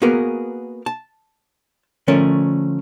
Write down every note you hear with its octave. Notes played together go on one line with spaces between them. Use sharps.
A#3 B3 F#4 G#4 A#4 B4
A5
D3 F3 A3 C#4 A#4